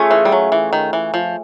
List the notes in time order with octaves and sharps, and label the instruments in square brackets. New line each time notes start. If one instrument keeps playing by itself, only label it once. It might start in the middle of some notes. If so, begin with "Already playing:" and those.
Already playing: [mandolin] A3 C#4 F4 G#4
[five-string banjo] E3
G3
F#3
E3
D#3
E3
F3